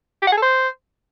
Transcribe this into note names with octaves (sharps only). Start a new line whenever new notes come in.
G4
F#5
G#4
A4
C5